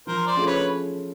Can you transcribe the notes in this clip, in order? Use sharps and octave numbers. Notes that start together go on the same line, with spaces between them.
F3 A#4 C5
C5 D5
A3 C#4 F4 G#4
B4 C#5